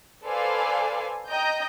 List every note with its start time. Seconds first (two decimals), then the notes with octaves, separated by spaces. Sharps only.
0.24 A4 B4 C5 D5 F5 G#5
1.29 D#5 G5 A#5 G6